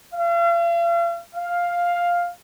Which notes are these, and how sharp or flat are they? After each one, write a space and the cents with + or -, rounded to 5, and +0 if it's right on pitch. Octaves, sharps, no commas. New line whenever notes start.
F5 -40
F5 +5